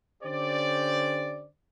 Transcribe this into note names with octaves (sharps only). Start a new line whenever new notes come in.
D3 C#4 G4 C5 D5